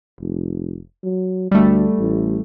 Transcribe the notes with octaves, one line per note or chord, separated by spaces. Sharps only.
F1
F#3
D2 G3 A3
A1